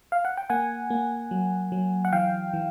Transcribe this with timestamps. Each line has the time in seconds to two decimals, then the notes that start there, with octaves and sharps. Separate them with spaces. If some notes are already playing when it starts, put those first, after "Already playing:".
0.12 F5
0.25 F#5
0.37 G5
0.50 A#3 F#5 G#5
0.90 A#3
1.31 F#3
1.72 F#3
2.05 F#5
2.13 E3 F5 G5
2.53 E3